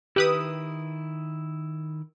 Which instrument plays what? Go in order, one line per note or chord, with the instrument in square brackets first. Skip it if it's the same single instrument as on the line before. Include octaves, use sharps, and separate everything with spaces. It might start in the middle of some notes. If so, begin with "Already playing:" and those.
[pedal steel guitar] D#3 E4 [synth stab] G4 B4 D#6